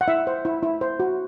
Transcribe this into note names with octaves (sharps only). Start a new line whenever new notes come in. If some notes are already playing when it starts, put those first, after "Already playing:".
F#5
E4 E5
C5
E4
E4
C5
F#4